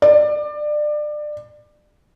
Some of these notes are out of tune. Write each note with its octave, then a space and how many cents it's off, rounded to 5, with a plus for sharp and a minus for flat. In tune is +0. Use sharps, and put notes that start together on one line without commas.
D5 +25